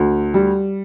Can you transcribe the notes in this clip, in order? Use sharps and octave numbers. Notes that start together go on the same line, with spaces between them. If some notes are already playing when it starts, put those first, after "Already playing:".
Already playing: D2
G3